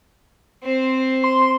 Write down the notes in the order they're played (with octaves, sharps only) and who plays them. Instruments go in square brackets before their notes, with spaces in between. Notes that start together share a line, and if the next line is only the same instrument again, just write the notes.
[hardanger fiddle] C4 C5
[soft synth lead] C6